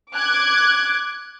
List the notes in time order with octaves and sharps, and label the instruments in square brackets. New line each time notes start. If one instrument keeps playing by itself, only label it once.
[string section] D6 F#6 G#6